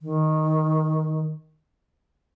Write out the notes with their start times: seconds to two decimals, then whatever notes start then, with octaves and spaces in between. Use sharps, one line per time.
0.02 D#3